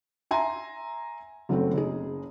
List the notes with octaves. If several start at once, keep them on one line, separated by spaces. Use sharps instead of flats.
E5 G#5 A#5 C6
F#1 F#3 A3 C4
F#1 D#4 G#4